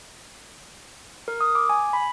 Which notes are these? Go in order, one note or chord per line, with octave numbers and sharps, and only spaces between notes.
A#4
D#6
D6
G#5
B5